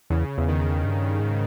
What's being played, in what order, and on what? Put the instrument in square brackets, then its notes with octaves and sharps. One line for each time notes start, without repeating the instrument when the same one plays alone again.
[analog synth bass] E2 [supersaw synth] C#3
[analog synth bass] E2
[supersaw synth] D#3
[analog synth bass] G2
G#2